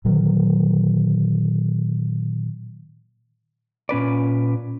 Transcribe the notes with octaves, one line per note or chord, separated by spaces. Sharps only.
A#2 D3 D#3 F#3
A#2 C#4 B4 D5